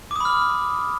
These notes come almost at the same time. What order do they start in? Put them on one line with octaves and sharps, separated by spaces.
D6 D#6 B5 F6